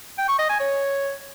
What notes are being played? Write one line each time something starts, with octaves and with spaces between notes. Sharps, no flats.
G5
C#6
D#5
G#5
C#5